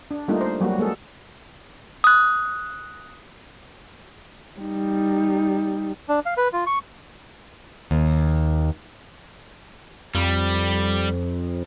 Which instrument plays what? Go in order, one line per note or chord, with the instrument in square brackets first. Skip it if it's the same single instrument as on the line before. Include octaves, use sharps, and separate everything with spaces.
[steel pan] D4
G3 A3 A#3 D4 D#4 F4
C5
F#3 G3 A#3 F#4
G#3 A#3 G#4 A4
[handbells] D#6 F#6
[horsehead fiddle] G3 D#4
[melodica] D4
F5
B4
F4
C#6
[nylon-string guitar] D#2
[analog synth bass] F2 [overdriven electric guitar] G3